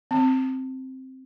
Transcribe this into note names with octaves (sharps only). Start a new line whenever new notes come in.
C4